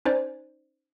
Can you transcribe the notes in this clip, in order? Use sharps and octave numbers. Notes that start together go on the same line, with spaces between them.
C#4 D#4 C5 D5